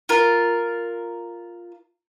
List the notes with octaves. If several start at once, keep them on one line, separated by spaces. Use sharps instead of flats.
F4 A#4